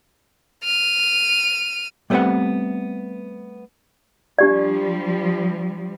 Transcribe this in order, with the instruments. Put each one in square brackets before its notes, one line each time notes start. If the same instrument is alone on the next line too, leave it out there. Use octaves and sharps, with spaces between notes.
[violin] F6 D#7
[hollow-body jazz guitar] G3 A3 B3 C4 B4 F#5
[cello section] F3 G3 [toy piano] D4 G4 D5